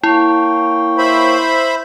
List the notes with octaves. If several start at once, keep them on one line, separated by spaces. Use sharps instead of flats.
A#3 E4 C#5 G5
C5 E5 B5